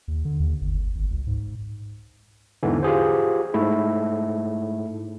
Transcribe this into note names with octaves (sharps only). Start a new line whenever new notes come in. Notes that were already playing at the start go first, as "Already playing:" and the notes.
D#2
D3
D#2
G1
F#1
G#1
C#2
G#2
E2 G#2 D3 E3
F4 G4 G#4 C5
G#2 A3 E4